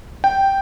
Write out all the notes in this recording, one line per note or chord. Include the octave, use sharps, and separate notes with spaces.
G5